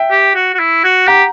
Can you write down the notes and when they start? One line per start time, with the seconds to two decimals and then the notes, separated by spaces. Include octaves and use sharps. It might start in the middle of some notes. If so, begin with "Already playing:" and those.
Already playing: E5 G5
0.11 G4
0.35 F#4
0.55 F#4
0.59 E4
0.84 F#4
1.07 G4 F#5 A#5